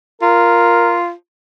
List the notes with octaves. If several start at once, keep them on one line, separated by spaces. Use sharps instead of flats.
F4 A#4